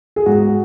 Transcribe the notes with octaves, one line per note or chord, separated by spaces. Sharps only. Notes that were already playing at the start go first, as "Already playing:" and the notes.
G#4
G#2 F#4